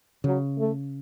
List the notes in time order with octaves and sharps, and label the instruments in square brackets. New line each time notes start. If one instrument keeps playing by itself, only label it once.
[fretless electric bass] C#3 [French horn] F#3
[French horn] A3